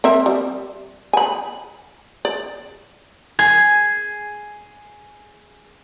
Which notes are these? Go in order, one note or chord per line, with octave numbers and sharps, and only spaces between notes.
C4 A#4 E5
G3
G#5 B5
D5
G#4 G#6